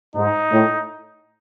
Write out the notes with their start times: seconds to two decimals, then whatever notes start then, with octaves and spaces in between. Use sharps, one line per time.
0.15 G#2 D#4
0.52 A2